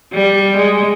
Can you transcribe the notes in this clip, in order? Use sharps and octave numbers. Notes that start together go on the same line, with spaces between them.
G3
G#3